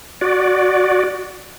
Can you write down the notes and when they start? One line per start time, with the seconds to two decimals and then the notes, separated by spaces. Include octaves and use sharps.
0.21 F#4 D5